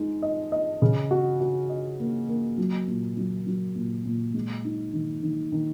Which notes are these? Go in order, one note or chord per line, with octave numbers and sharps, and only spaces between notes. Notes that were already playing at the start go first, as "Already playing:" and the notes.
Already playing: G#3 D#4 G#4
D#5
D#5
C#3
F#4
F#4
D#5
A#3
A#3
F#3
A#2
F#3
F#3
A#2
A#2
G#3
D#4
D#3
D#3
D#3